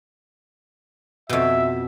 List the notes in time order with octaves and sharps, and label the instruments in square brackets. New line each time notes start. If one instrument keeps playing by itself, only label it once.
[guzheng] F2 B2 [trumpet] E5